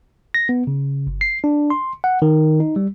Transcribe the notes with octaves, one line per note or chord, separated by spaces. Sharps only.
A#6
B3
C#3
G1
C7
D4
C6
F#5
D#3
D#4
G3